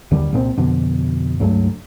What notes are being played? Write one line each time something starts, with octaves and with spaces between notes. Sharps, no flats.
D#2 D3 G3
C2 A#2 G#3 C4
F2 B2 D3
C#2 G2 F#3 A3